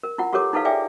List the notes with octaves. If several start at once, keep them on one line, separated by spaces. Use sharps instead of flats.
A#4
E4 F4 F#5
F4 G4 A4 A#4 C#5 D6
D#4 E4 A4 B4 F5
G#4 D5 E5 G5 G#5